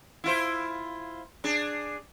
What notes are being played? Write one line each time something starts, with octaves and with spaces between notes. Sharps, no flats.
E4 F4 C5
D4 G#4